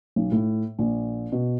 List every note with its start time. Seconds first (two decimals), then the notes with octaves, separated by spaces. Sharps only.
0.16 B1
0.32 A2
0.79 A#1
1.32 B2